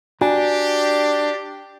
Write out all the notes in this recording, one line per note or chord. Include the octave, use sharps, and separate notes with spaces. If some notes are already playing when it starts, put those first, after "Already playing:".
D4 F#4 G4 G#5 A#5